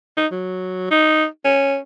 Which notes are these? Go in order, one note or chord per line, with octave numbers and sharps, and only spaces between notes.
D#4
F#3
D#4
C#4